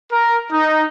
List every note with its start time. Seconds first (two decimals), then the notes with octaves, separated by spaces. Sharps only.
0.12 A#4
0.52 D#4